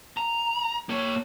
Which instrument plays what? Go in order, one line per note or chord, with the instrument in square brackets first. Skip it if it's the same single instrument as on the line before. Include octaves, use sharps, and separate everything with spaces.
[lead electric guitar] A#5
A#3 C#5